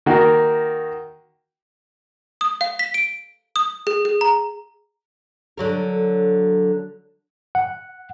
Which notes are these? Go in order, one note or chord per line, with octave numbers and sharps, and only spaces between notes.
D#3 A#3 F#4
D#6
F5
B6
D7
D#6
G#4
G#4
A#5
D3 F#3 A#4
F#5